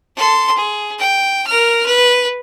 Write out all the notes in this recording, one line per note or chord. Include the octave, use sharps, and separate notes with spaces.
A4 C6
G#4
G5
A#4 F6
B4